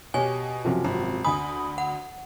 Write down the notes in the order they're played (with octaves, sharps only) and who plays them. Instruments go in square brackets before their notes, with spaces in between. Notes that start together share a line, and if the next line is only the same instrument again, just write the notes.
[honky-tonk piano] B2 [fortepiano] G4 C#5 [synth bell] G#5
[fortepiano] F#2 C3 F3
[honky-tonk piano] G#1
[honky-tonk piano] D2 B5 [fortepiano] G#5 [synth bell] D#6
[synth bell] F#5